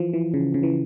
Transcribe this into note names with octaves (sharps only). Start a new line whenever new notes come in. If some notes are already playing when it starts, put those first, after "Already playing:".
Already playing: E3 F3
E3
C#3
C#3
E3